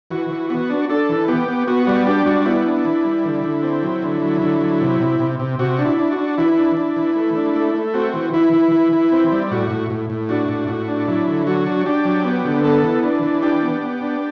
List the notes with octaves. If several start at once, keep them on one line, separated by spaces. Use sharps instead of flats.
E3 F#4
E3
B3 F#4
D4
D4 A4
E3
B3 G4
B3
B3 F#4
G3 F#4
D4 G4
G3 F#4
B3 E4
D4
E3
G3
D3
D3
C4
F#3
D3
F#3
D3
F#3
C3
C3
C3
C3
C3 F#4
D4
E4
D4
F#4
D4
E3 E4
D4
D4
E3
A3
D4
A3
A3
C4 F#4
E3
E3 E4
E3
E3
E3
C4
G3
A2 F#4
A2
A2
A2
D4 F#4
A2
A2 F#4
D4
F#3 E4
D3
F#3 F#4
D4
D4 G4
F#3
B3
D3
B3 A4
E3
D4
E3
D4 G4
B3
B3
D4